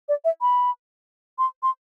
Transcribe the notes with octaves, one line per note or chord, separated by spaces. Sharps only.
D5
E5
B5
C6
C6